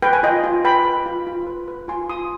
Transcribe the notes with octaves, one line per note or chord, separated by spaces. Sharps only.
B4 G5
G#5
F4 D#5 G5
F4
B4 G5 B5
B4
F4
F4
B4
B4
F4 G#5 C6
F4 C6 D#6